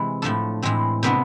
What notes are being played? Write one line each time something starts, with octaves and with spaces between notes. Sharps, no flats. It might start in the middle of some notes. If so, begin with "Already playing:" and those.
Already playing: C3 E3 G#3
A2 F3 A3 D4 A4
A2 E3 G#3 C4
C3 G#3 B3 D4 B4